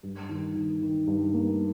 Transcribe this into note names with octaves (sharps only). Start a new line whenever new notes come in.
G2
D#3
D#3
D#3
G2
A#3